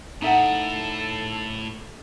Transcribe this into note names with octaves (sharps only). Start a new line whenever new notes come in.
A2 D#4 A4 E5 F#5